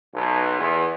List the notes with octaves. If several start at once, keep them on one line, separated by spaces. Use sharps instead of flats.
B1
E2